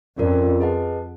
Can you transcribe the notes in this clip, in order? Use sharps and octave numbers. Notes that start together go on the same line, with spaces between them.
F2 C#4 F4 A#4 D5
G#4 B4 D#5 F#5 A5